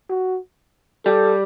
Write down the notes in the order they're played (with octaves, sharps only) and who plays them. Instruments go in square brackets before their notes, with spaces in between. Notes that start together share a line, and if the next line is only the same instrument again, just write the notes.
[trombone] F#4
[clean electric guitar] G3 [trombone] A4